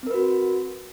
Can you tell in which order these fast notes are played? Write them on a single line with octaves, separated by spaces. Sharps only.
C4 A#4 B4 F#4